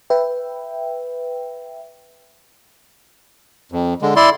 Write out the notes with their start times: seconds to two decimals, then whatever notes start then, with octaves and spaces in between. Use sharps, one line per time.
0.10 B4 E5 G5
3.72 F2
4.02 D3 G#3
4.16 E4 D5 C6